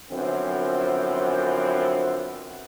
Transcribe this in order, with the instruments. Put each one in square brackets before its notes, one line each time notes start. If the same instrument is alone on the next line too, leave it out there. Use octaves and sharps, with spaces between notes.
[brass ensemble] F#2 D3 E3 F3 B3 C4